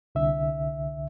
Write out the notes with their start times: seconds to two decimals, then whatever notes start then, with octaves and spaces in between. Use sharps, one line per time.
0.15 C2 D3 E5